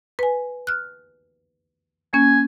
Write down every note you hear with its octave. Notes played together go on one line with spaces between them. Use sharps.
B4 G#5
F6 F#6
A#3 C#4 G#5